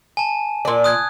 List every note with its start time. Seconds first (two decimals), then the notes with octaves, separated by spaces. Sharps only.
0.17 G#5 A5
0.65 A#2 D5
0.84 D#6 F#6 G#6